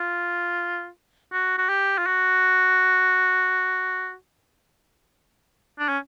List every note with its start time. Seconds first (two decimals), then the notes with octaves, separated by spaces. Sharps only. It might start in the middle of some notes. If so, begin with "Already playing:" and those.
Already playing: F4
1.33 F#4
1.58 F#4
1.69 G4
1.98 F4
2.06 F#4
5.79 D4
5.88 C#4